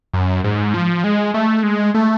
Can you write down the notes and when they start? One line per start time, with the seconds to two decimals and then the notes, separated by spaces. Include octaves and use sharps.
0.13 F#2
0.44 G#2
0.74 F3
1.04 G#3
1.34 A3
1.63 G#3
1.94 A3